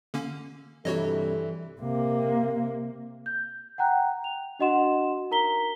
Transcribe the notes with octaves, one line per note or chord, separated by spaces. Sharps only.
D3 A#3 C#4
G2 C3 E3 G3 F#4 A4 C#5 D#5
C3 A#3
G6
F#5 G5 A#5 F#6
F7
D4 F#4 D#5 F#5 C6 E7
D#4 A#4 A#5 B6 G7